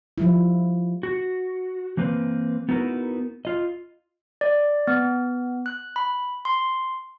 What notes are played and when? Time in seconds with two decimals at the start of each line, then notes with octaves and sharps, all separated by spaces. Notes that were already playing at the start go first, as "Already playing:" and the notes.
0.18 F3 G3 E4
1.03 F#4
1.97 E3 A#3 C4 B4
2.69 B3 D#4 E4 F#4 A#4 B4
3.45 F4 D#5
4.41 D5
4.87 B3
5.66 F#6
5.96 B5
6.45 C6